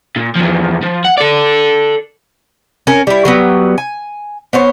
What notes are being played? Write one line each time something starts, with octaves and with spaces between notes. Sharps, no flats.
A#2
E2 F3
F3
F#5
A4 D5
C#4 A#4
G3 E4
F#3 G3 B3
G#5
B3 C5 C#5